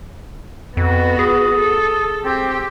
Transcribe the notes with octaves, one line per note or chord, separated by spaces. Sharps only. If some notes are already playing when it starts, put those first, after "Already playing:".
F2 B3 F#4
G#4 D#6
A4
C4 G4